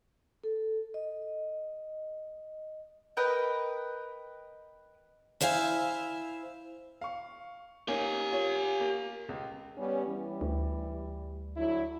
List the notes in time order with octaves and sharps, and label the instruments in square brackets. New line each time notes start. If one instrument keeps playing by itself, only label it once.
[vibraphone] A4
D#5
[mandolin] A#4 B4 D#5 G5
[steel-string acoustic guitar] E4 C5 E5 F5 G#5
[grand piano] F5 C#6
[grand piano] A#3 C#4 D#4 [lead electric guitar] G4 G#5
[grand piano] F4 C#5
A#3
C#2
[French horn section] G3 B3 C#4
E3 G3
[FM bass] D2
[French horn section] D3 F#3 E4